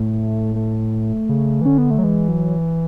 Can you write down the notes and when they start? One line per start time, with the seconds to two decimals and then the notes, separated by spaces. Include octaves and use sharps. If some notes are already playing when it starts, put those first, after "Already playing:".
Already playing: A2 A3
0.55 A3
1.29 C#3
1.61 E3
1.65 D3 C#4
1.78 B3
1.91 A3
1.99 F#3
2.04 E3 G#3
2.29 F#3